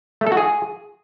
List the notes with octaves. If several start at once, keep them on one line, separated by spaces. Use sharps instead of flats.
A3
A4
F#4
G#4